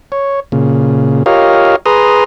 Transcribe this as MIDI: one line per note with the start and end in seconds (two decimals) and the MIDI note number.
0.12 0.40 73
0.52 1.23 46
0.52 1.23 49
1.26 1.76 65
1.26 1.76 67
1.26 1.76 70
1.26 1.76 73
1.26 1.76 75
1.26 1.76 77
1.86 2.24 68
1.86 2.24 71
1.86 2.24 82
1.86 2.24 84
1.86 2.24 87